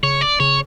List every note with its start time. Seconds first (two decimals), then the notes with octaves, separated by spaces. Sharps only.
0.03 C#3 C#5
0.21 D5
0.40 C#3 C#5